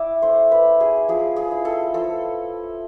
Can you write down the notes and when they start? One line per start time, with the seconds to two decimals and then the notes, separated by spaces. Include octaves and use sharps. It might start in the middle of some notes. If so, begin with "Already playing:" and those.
Already playing: E4 D5 E5
0.22 A3 C5
0.52 B4
0.65 C4
0.80 G#4
1.08 F3 G#4
1.36 G#4
1.51 E4
1.65 A4
1.94 F3 A4